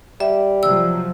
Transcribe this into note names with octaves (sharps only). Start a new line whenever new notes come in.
G3 E5
C3 F3 F#3 E6